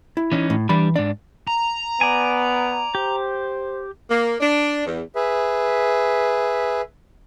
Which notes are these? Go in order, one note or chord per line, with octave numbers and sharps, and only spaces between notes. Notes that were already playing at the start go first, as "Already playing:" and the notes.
E4
E3 C#4 D#4
A2
E3 G3 D4 B5
G#2 D4 D5
A#5
B3 D5 G#5
G4 C5
A#3
D4
E2
G#4 B4 E5